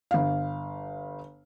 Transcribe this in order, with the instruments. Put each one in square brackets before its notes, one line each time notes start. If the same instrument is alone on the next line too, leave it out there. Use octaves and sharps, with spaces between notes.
[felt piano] G1 F5